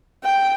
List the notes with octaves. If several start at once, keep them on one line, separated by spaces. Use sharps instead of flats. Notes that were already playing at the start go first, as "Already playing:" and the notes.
G5